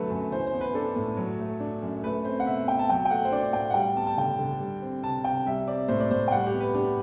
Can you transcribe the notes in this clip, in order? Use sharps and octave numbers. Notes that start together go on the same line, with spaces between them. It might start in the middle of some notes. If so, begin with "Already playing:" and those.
Already playing: B2 D3 F#3 A3 A4 B4
F#2
E3 C5
C5
B3
B4
D4 A4
A2
F#3
A3
D4
F#2
A3 B4
C4 C5
F#5
B2 E5
B2 G5
A5
F#3 G5
G5
A3 F#5
C5
D4 D5
A2 G5
F#5
G3 G5
B3 A5
A5
D3 G5
D3
G3
C4
C3 A5
C3 G5
G3 E5
C4 D5
A2 C5
D5
A2 C5
G5
G3 F#5
G4
B3
B4
D4 G4